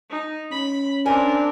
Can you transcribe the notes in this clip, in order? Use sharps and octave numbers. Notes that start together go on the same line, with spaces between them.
D#4
C#4 B5
C4 D4 A#4 G#5